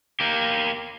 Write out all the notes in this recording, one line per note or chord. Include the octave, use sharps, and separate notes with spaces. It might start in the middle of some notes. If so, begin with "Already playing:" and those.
A#3 G4